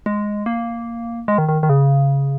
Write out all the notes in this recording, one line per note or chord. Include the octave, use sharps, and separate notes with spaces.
G#3
A#3
G#3
D#3
D#3
D#3
C#3